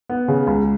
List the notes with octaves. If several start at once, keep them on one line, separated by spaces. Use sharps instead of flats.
B3
C#3
C#2